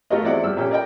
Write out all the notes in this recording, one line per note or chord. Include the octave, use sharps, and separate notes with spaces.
A3 F4 F#4 A#4 D#5
E2 C4 E4 A4 D5 F#5
G2 F3 E6
A#2 C#4 G4 A4
A#4 D5 D#5 G5